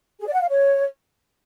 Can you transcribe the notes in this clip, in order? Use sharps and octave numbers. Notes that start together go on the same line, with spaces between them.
G#4
D5
F#5
F5
C#5